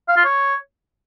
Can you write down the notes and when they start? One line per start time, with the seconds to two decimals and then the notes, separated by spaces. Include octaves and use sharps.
0.09 F5
0.17 F4
0.25 C#5